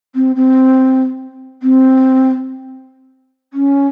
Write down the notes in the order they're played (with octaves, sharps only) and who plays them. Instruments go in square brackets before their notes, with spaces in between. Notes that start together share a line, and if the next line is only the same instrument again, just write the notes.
[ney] C4
C4
C4
C#4